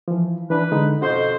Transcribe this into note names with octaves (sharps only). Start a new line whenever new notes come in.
E3 F3
E3 D4 B4
D3 G#3 D#4
F2 B2 C#4 F#4 C5 D#5